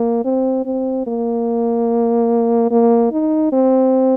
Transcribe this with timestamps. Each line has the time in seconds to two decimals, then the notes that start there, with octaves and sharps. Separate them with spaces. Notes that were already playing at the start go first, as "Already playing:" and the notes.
Already playing: A#3
0.25 C4
0.66 C4
1.07 A#3
2.71 A#3
3.12 D#4
3.52 C4